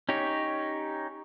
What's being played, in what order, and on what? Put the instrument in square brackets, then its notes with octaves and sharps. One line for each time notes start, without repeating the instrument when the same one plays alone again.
[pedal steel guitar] C#4 D#4 G4 C#5